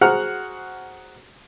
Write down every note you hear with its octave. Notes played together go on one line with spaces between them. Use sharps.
F#4 G#4 C5 F#5 A#5 F6